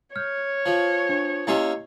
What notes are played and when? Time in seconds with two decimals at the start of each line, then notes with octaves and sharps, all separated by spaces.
0.16 C#5 F6 G6
0.66 F3
1.09 D4
1.47 A#3 C#4 E4 G4 D#5 E5